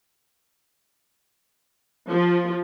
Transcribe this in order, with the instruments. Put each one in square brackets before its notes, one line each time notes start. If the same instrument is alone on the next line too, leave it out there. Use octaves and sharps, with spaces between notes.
[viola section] F3